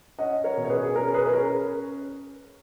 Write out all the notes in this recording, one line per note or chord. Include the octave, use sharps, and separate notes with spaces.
C#4 D#5 F#5
A#4 C#5
B2
C#5
G#4 B4
G#4
C#4 A#4
G#4 B4
B4
C#4 A#4